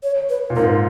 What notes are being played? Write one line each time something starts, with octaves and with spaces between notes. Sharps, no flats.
C#5
B4
A#2
G#2 A#4